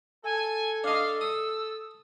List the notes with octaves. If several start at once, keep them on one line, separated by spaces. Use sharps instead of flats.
A4 G#5
D4 D#5 F5
D#6 E6